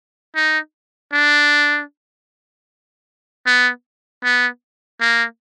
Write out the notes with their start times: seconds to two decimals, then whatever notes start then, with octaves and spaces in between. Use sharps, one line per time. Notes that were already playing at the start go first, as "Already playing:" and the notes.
0.35 D#4
1.13 D4
3.46 B3
4.24 B3
5.01 A#3